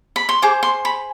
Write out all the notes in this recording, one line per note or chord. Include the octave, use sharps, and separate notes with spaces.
B5
C6
G#4 C5 D6
C6
B5